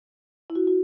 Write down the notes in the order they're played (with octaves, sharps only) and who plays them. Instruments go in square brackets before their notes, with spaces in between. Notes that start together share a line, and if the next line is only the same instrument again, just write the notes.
[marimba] E4
F#4
F#4